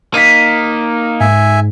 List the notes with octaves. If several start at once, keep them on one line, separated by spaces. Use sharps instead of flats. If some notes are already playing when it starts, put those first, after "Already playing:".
A#3 D#4 B6 D#7
G#2 E5 G#5